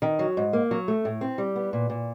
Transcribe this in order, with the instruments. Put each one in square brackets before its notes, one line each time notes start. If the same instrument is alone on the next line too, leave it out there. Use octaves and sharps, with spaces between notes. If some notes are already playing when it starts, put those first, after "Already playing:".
[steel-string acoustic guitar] D#3
F#3
G#2
A#3
F#3
A3
A2
C4
G3
B3
A#2
A#2